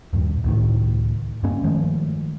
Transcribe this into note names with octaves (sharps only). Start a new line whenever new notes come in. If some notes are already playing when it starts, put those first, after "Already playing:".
D#1 G2
C#2 A2 D#3
G2 A#3 C#4
D#3 F3 G#3 A3